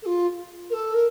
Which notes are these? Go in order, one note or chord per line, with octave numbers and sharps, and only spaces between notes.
A4
F4
A#4
A4
A#4